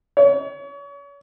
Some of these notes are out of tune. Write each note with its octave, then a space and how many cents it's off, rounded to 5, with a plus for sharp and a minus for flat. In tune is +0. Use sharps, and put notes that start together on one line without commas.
C#5 +35